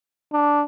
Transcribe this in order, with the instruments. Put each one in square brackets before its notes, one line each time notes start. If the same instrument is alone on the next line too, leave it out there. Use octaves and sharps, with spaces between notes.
[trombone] D4